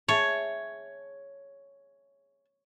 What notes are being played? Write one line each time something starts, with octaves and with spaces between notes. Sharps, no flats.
G#4 C#5 E5 A5